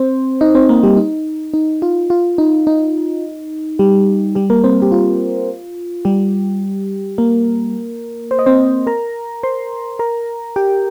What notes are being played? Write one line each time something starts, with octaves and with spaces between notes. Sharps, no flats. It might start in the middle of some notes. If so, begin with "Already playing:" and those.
Already playing: C4 C5
D#4 D#5
C4 C5
A#3 A#4
G3 G4
D#4
D#4
F4
F4
D#4
D#4
G3 G4
G3 G4
A#3 A#4
C4 C5
G4
F4
G3 G4
A#3 A#4
C5
D#5
C4 C5
A#4 A#5
C5 C6
A#4 A#5
G4 G5